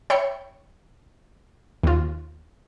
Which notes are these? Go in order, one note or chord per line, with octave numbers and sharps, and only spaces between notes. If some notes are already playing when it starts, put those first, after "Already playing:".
C#5 E5 G5 B5 C#7
D#2 F4